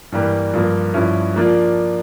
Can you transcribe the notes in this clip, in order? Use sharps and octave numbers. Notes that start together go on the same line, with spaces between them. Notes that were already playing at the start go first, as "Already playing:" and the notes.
G2 E3 G3 A#3
G2 F3 A#3
G2 F3 C#4 E4
F3 A#3 D4 F4